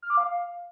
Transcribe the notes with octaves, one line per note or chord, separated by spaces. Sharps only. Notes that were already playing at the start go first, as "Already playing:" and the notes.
F6
D6
F5